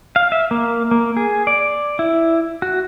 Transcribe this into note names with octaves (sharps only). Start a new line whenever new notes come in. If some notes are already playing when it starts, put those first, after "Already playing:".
F5
E5
A#3
A#3
G#4
D5
E4
F#4